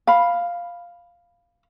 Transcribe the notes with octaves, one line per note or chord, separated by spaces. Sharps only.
F5 B5